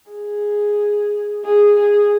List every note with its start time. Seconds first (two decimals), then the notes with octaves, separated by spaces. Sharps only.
0.10 G#4
1.45 G#4
1.79 G#4